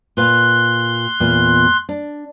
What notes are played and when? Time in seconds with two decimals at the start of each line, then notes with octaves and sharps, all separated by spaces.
0.17 A#2 B4 F5 C6 F#6
1.20 E2 A#2
1.89 D4